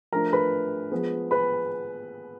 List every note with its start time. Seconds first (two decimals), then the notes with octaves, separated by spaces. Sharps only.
0.13 F3 A3 D4 A#4 A#5
0.33 B4 B5
0.92 F3 G#3 B3
1.31 B4 B5